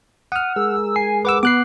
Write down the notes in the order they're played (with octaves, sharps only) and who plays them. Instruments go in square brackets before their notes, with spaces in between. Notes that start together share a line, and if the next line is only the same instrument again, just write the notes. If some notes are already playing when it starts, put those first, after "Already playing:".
[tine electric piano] F#5 F6 [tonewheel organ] D#6
[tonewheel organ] G#3 G#4 A#4 [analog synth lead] E6
[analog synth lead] G#5 [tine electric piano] C7
[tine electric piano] B4 F#5 E6 [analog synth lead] D6
[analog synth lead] B3 [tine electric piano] D6 F#6 C7